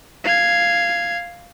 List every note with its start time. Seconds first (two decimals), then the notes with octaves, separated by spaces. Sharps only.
0.24 F5 G#6